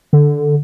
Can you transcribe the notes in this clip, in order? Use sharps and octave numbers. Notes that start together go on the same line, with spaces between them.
D3